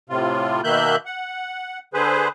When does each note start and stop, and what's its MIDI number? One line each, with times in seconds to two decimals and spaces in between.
0.10 0.61 45
0.10 0.61 48
0.10 0.61 65
0.64 0.96 47
0.64 0.96 51
0.64 0.96 58
0.64 0.96 76
0.64 0.96 90
0.64 0.96 91
1.05 1.79 78
1.94 2.28 50
1.94 2.28 68
1.94 2.28 71
1.94 2.28 72